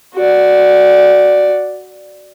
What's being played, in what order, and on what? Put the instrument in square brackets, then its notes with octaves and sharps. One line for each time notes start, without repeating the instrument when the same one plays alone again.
[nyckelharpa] F#4 D5